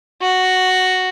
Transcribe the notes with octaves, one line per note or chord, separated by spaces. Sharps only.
F#4